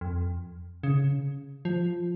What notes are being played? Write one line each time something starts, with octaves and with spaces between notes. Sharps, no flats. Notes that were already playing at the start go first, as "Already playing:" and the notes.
F2
C#3
F3